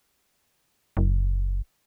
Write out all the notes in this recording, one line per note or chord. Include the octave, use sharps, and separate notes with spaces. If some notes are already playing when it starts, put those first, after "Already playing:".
F#1